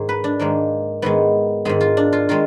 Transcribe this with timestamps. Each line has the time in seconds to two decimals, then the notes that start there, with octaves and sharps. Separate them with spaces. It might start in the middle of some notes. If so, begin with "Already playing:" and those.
Already playing: G#2 D#3 G#3 G#4
0.09 B4
0.24 D4
0.39 G#2 D#3 G#3 A#3
1.02 G#2 D#3 G#3 B3
1.65 G#2 D#3 G#3 G#4
1.81 F4
1.97 D4
2.13 F4
2.29 D#3 G#3 F4